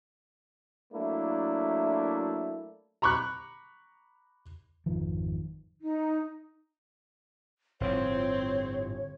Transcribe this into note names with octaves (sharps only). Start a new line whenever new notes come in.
F#3 A3 A#3 D4 E4
A#5 B5 C#6 D6 F#6
G#1 F2 D#3 F3
D#4
G1 A2 F3 C4 C#5